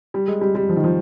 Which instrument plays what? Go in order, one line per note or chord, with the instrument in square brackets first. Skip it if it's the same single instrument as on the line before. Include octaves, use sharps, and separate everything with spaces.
[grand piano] G3
G#3
G3
G3
F3
D#3
F3